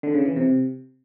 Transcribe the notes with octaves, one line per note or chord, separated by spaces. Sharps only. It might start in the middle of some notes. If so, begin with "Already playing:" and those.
D3
C#3
E3
C3